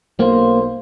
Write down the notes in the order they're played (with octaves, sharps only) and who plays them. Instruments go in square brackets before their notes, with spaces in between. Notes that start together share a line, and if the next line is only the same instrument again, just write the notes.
[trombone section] B1 C5 [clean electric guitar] A#3